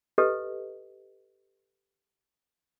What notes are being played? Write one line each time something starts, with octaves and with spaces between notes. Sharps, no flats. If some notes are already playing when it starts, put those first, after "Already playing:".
G4 A4 B4 D#5